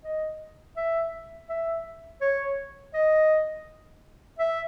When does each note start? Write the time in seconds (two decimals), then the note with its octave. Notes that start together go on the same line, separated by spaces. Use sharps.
0.04 D#5
0.76 E5
1.49 E5
2.21 C#5
2.94 D#5
4.39 E5